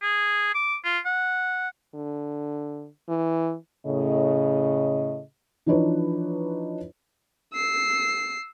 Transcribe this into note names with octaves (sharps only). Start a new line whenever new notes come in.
G#4
D6
F4
F#5
D3
E3
A2 C#3 D#5
E3 F3 D4 D#4 B4 C#5
E6 C7